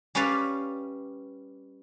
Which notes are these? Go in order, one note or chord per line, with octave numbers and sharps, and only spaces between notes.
G3 C#4 G4 B4 D5 F5